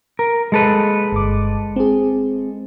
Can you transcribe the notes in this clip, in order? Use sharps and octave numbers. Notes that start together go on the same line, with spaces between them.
A#4
G#3 A4 B4
G1 D6
C4 G#4